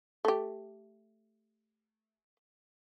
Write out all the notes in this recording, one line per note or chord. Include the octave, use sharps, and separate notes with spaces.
A3 G4